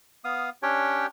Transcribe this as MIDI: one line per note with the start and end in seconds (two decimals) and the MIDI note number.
0.24 0.50 59
0.24 0.50 77
0.24 0.50 87
0.63 1.06 61
0.63 1.06 62
0.63 1.06 67
0.63 1.06 73
0.63 1.06 79